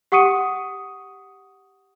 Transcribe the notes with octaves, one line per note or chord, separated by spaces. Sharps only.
G4 F#5 C#6 D#6 C#7 D#7